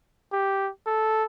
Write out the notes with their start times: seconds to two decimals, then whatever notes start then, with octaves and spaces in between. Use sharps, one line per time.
0.32 G4
0.86 A4